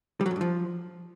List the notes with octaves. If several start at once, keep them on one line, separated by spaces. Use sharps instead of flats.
G3
F#3
F#2
G2
F3